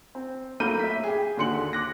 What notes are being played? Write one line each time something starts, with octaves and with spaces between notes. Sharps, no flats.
C4
F#3 A3 A#3 B5 G6 D#7
E5 B6
G4 G#4
D#2 D3 F#4 C6 C#7 F#7
D6 F#6 A#6